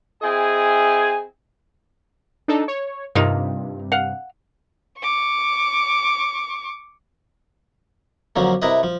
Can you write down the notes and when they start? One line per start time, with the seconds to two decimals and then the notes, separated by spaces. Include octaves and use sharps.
0.22 C4 E4 G#4 D#5 G#5
2.48 D4 D#4 A4
2.68 C#5
3.15 G2 C3 A#3 D#4 F4
3.92 F5 F#5
4.99 C#6 D6
8.36 F2 D3 F3 F#3 A#3
8.62 C3 E4 A#4 B4 D#5
8.83 F3